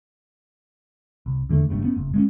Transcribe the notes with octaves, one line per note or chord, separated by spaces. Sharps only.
C2
E2 D3 D#3 A3
F#1 G2 A3
A3 B3 C#4
F#1
G#3 A3 C#4